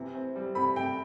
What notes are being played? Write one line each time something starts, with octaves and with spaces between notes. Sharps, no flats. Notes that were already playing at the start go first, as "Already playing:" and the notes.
Already playing: C3 E3
C4
G3
C3 B5
C3 G5